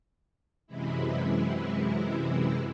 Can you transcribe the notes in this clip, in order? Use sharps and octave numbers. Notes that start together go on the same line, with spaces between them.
F#2 C3 E3 G#3 E4